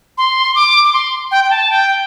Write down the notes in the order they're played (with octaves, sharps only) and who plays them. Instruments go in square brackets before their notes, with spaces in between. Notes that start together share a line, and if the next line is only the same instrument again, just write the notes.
[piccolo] C6
D6
D6
C6
G5
G5
A5
G5